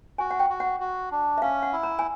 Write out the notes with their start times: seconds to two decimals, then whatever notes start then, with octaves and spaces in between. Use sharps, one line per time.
0.18 F#4 G#5
0.31 F#5
0.39 G5
0.50 F#4
0.60 F#5
0.80 F#4
1.11 D4
1.38 E5
1.42 C#4 F5
1.63 F#5
1.73 E4
1.83 A#5
1.99 G#5